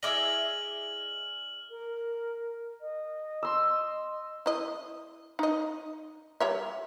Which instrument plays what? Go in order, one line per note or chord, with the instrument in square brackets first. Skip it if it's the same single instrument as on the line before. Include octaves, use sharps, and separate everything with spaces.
[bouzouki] E4 G#4 D5 [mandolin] D#5 D6 E6 [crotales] F6 F#7
[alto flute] A#4
D#5
[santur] C6 E6
[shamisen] E4 D#5
D#4 D#5
G3 C#5 E5